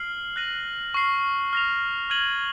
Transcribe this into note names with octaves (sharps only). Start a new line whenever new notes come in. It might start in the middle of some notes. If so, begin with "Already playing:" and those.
Already playing: F6 C7 F#7
F#6 A#6 D#7 F#7
C#6 F6 C7
F6 A#6 F7
F6 G#6 D#7 F#7